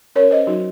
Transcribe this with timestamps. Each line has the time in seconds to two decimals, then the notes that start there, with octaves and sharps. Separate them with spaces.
0.15 C#4 A#4 C#5
0.31 C#4 C5 D#5
0.47 F#3 D#4 F#4